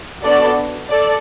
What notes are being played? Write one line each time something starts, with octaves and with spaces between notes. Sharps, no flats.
B3 D4 F#4 A4 D5
A4 D5